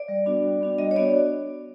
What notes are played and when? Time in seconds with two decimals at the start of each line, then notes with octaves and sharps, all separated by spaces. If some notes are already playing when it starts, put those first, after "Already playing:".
Already playing: D5
0.08 G3
0.25 B3 D4 F#4
0.43 G3
0.61 B3 D4 F#4
0.78 G3 D#5
0.91 C#5
0.96 B3 D4 F#4 D5